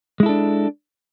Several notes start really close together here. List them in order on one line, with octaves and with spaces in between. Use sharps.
G#3 E4 A4 D4